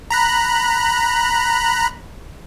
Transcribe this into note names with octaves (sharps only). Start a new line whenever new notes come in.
A#5 B5 F#6